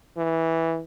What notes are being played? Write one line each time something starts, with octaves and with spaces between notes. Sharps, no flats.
E3